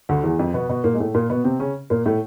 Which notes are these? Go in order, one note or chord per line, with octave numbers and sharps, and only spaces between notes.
D2 D3
E2 E3
F2 F3
B2 B3
B2 B3
A#2 A#3
G#3
A2 A3
A#2 A#3
B2 B3
C3 C4
C#3 C#4
A#2 A#3
A2 A3